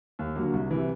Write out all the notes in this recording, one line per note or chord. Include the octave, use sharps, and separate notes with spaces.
D#2
D3 F#3 A#3
C2
C3 E3